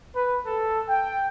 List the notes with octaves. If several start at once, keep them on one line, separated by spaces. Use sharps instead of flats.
B4
A4
G5